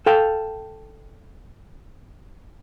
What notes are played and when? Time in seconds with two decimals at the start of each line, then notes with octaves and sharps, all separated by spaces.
0.06 A4 F5 G5